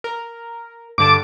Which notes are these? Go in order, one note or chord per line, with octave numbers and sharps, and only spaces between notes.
A#4
G2 D3 A5 D6